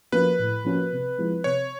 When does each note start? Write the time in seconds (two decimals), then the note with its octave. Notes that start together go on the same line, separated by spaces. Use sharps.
0.12 F3 A#3 C#4 F#4 B4
0.39 A2
0.65 F3 A#3 C#4 F#4
0.92 C3
1.18 F3 G#3 C4 E4
1.44 C3 C#5